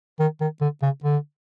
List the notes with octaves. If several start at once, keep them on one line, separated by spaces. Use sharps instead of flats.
D#3
D#3
D3
C#3
D3